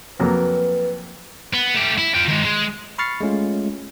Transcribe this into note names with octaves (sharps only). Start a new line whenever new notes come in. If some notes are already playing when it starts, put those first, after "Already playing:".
F2 F#3 A#3 B4
B3
A3 G4
E4
F4 G5
D#3 G#3
G#3
B5 C#6 F6 A6 C7 C#7
G#3 A3 C#4 F4